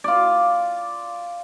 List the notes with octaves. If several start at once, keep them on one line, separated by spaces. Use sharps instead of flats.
F4 D5